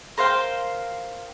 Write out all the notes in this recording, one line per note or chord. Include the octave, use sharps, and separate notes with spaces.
A#4 C5 F5 G5